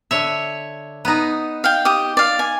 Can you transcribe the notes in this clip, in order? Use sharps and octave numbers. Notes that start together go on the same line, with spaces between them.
D3 C#5 E5
B3 D#4
F5 G5
G4 D#6
D5 F5
G#5